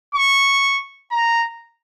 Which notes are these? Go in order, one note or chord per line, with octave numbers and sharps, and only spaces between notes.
C#6
A#5